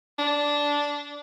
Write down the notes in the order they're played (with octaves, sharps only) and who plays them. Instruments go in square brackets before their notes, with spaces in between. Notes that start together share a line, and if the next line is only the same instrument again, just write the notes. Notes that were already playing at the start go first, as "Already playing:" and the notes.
[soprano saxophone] D4